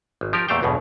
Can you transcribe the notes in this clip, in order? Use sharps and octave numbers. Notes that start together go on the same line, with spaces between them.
G#1
F3 G4 A#4
E2 A#2 A3 C5 F5 G5
B1 E2 G2 B2